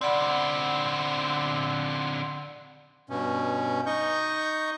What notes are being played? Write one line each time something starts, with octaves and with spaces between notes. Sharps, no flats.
D3 C4 D5 F#5 B5
G2 B2 C#4
D#4 D#5 C#6 G6